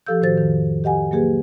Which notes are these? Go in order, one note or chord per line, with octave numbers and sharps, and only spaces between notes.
F3 G4 A4 F5 E6 G6
A2 D#3 F#4 C5 A6
F2 D#3
G4 D#5 F#5 G#5
F#3 A#3 G4 G#4 B4